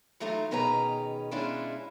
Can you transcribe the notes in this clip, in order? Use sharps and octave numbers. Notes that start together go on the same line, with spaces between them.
E3 F#3 A3 D#4 F4
B2 D#3 C#4 G#4 B4 A#5
B2 G#3 C#4 D4 E4 F4